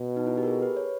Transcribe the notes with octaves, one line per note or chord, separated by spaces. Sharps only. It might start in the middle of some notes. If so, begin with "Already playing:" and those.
Already playing: B2
D#4
E4
G4
A#4
G#4
B4
C#5